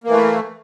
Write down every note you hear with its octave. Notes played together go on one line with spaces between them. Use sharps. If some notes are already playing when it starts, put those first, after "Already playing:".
E3 A3 A#3